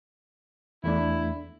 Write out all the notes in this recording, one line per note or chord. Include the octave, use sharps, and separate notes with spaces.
E2 A3 D4 E4